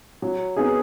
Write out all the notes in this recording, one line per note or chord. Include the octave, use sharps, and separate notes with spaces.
F#3
B3 D#4 G#4